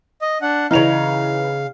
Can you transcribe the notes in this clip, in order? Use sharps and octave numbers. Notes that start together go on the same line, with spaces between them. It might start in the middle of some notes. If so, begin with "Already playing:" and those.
D#5
D4 F#5
C#3 E3 D#4 F5 F7